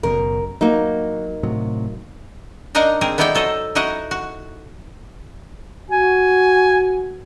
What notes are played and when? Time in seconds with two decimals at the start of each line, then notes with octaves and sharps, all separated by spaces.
0.03 F#1 F#2 B2 A#4
0.61 F#3 A#3 D#4
1.43 A2 C3 F#3
2.75 D4 D#4 A#4 D#5 F5 F#5
3.01 C4 G#4 A#4
3.18 B3 D#4 E4 A4 D5 G5
3.35 F#3 A4 C5 D#5
3.75 D#4 E4 F#4 D#5 F#5
4.11 F#4
5.90 F#4 G#5